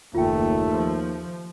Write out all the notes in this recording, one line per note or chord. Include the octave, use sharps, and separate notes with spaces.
F#1 D#2 A3 F4 G5
F3